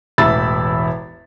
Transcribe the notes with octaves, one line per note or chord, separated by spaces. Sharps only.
E1 A1 E5 B5 E6 A6